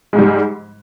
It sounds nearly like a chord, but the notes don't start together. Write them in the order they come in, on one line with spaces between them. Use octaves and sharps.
G#3 G#2 G3